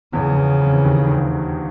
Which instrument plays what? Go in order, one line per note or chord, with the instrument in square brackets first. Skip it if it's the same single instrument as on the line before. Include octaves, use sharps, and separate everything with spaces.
[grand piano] E2 E3 [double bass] C#3
[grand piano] F3
E2 E3
F2 F3
E3
D#2 D#3
D#3
D2 D3